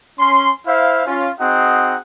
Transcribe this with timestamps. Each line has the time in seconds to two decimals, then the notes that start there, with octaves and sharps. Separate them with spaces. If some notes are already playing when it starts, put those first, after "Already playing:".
0.19 C#4 C6
0.67 E4 C5 E5 F5
1.06 C#4 F4
1.39 C4 D#4 F#4 G#4 D#5 F#5